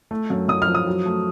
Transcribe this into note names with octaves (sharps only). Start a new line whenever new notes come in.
A3
F#2
F#2 D#6
F6
F3
D#6
F#3
A3